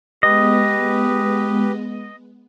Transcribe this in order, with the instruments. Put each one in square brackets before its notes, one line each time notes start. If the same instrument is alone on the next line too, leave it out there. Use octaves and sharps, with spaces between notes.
[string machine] G#3 B3 [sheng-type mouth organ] G4 B4 [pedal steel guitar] D#5